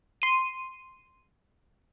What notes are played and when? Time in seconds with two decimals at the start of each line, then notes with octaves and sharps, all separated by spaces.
0.22 C6 D#7